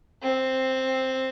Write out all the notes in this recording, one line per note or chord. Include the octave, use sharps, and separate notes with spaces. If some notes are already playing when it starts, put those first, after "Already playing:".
C4